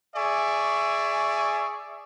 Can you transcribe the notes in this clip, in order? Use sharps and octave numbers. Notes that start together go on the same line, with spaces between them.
G#4 D5 E5 G#5 C#6